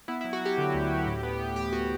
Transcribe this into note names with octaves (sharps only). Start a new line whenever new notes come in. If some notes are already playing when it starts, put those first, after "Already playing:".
B3 E4
F#3 E4
F#4
F#3 G4
D3
D2
D2
A2
B3
B3
E3 G4
B3 F#4